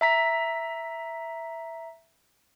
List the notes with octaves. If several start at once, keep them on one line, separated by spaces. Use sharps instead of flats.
E5 A#5 B6